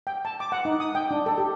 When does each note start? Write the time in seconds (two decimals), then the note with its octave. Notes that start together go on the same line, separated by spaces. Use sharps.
0.07 G5
0.25 A5
0.40 D6
0.52 F#5
0.65 D#4
0.80 D#6
0.95 G5
1.11 D4
1.26 A4
1.38 G4